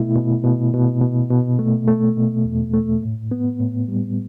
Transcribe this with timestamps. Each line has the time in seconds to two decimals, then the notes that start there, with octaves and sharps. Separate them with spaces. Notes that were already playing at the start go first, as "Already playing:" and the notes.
Already playing: B2 A3 E4
0.15 B2
0.44 B2
0.74 B2
1.01 B2
1.30 B2
1.59 A3
1.88 A3
2.17 B2
2.45 E2
2.74 A3
3.03 A2
3.31 B3
3.60 A2
3.88 G3